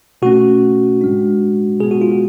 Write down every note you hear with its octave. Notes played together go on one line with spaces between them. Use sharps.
B2 A3 C#4 F#4
A2 G#3 D4
B2 G#3 B3 G#4
F#4
F4
F#4